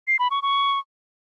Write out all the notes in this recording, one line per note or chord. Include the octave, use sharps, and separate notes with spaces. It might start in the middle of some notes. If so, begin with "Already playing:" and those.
C7
B5
C#6
C#6